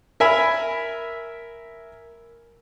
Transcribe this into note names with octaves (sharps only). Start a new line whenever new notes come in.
A#4 E5 G#5 B5